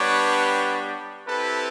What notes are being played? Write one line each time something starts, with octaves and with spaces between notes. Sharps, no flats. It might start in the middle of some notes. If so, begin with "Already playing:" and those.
Already playing: G3 B3 D4 G4 B4 C#5
C4 E4 G4 A4 B4